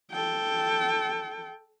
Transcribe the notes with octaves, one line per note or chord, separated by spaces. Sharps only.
A4 G5